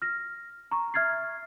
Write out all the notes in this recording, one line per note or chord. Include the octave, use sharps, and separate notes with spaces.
F6 A#6
A#5 C#6
E5 F6 G#6 A6 C7